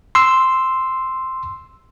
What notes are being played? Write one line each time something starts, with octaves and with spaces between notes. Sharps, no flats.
C6 E6